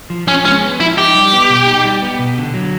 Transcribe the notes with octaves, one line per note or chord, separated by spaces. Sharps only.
F3
F3 C#4
G#3 C#4
B3
F3 E4
D#4 G4
G3
B3
B2
D#4
G3
B3
B2
D3
F#3